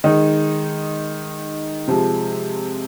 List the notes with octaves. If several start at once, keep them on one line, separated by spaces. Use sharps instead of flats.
D#3 G#3 D#4
C3 F3 G#3